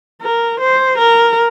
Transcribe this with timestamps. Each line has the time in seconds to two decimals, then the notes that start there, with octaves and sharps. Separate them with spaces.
0.22 A#4
0.60 C5
0.98 A#4